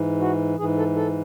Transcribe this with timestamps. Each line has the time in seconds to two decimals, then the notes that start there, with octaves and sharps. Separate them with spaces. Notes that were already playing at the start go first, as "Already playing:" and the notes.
Already playing: G#2 E3
0.20 F#4
0.58 G#2 E3 G#4
0.78 A4
0.96 A4